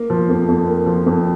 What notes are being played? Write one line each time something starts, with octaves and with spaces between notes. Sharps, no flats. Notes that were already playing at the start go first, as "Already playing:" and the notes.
Already playing: A#3
F3
F2
F2
A#3
F3
F2